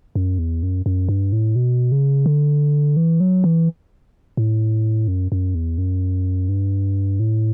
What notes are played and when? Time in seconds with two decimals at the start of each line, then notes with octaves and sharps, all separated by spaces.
0.15 F#2
0.38 E2
0.63 F#2
0.86 F#2
1.09 G2
1.32 A2
1.56 B2
1.92 C#3
2.26 D3
2.97 E3
3.20 F#3
3.44 E3
4.37 A2
5.08 F#2
5.32 F#2
5.55 E2
5.78 F#2
6.49 G2
7.20 A2